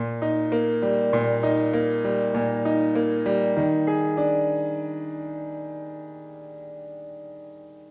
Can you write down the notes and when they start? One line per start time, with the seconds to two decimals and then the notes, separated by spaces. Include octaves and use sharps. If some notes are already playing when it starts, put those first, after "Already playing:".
Already playing: A#2
0.22 D#4
0.52 A#3
0.82 G3
1.13 A#2
1.43 D#4
1.73 A#3
2.04 G3
2.34 A#2
2.65 D#4
2.95 A#3
3.26 G3
3.56 D#3
3.87 G#4
4.17 D4